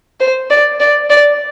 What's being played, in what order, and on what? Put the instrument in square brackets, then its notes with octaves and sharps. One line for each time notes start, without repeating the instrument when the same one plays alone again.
[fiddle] C5
D5
D5
D5